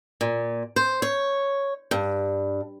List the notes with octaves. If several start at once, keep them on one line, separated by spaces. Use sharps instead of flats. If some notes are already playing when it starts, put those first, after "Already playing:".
A#2
C5
C#5
G2